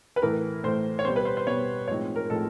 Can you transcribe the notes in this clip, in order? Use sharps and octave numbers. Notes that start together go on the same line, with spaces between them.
B4
A2 E3 A3 A#4
A2 E3 A3 C5
C#5
B2 G3 B3 C5
B4
C5
C5
B2 G3 B3 C#5
A2 F3 G#3 C4 D#4 C#5
A#4
A2 F3 G#3 C4 D#4 A4